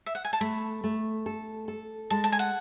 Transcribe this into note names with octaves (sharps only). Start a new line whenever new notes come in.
E5
F#5
G#5
A5
A3 B5
A3
A4
A4
G#3 A5
A5
G#5
F#5